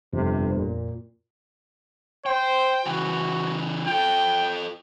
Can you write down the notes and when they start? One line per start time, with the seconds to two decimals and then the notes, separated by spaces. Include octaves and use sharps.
0.13 G1 F2 C3
0.54 A#2
2.26 C5 G5
2.86 C#3 E3 F#4
3.87 F4 A4 G5